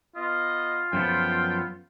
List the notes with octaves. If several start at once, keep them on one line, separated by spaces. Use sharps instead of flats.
B3 F4 D#5
F#2 F3 B3 A4 G5